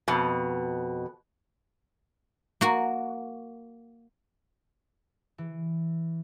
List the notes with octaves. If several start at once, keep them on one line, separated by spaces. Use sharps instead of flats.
F2 B2
A#3 F#4
E3